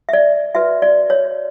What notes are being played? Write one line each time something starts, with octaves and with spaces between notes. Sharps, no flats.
E5
D5
F#4 B4 E5
D5
C#5